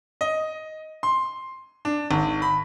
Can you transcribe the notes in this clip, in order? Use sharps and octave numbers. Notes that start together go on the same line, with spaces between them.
D#5
C6
D4
G#1
B5